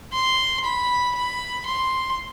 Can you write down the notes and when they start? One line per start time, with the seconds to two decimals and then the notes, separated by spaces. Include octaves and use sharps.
0.13 C6
0.64 B5
1.15 B5
1.66 C6